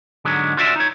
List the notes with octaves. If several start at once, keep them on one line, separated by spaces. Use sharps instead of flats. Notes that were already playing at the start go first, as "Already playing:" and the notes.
G#2 D3 F#3 G#3 B3
F4 F#4 D5 E5
D#4 C#5